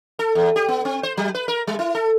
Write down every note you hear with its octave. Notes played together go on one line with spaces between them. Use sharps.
A4
E2
G4
B3
C4
C5
F#3
B4
A#4
G3
E4
A4